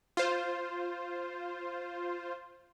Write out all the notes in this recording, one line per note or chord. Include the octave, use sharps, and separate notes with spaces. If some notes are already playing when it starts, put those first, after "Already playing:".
F4 C5